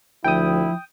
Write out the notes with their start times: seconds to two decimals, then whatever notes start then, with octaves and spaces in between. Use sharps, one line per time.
0.24 D2 F3 E4 G5 D#6